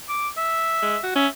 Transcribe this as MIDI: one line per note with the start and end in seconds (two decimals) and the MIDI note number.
0.09 0.28 86
0.37 1.02 76
0.82 0.97 56
1.04 1.14 66
1.16 1.27 61
1.16 1.28 76